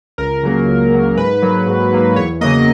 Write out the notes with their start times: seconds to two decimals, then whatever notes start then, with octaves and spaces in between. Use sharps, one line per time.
0.18 C#2 A#4
0.43 C#3 F#3 A#3
0.68 C#2
0.92 C#3 F#3 A#3
1.17 G#2 B4
1.42 F#3 A#3
1.67 G#2
1.92 F#3 A#3
2.16 E2 C#5
2.41 C#3 F#3 A#3 D#5